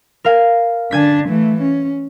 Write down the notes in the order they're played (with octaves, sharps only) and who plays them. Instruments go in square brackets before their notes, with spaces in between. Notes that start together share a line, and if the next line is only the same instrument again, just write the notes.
[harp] A#4 F5 G#5
[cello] D3 D4 [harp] G#5 G#6 B6
[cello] E3 A3
C#4